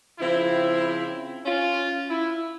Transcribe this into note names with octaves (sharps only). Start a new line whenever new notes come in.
C#3 F3 C4 E4
C#4 F4
E4